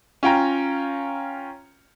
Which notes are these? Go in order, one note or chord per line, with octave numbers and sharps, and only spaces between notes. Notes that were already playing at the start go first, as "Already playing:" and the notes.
C#4 F4 G5 A#5